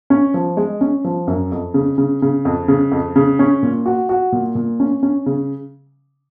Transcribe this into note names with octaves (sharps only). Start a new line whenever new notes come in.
C#4
F3
G#3
C#4
F3
F#2
F2
C#3
C#3
C#3
F2
C#3
F2
C#3
C#4
A#2
F#4
F#4
A#2
A#2
C#4
C#4
C#3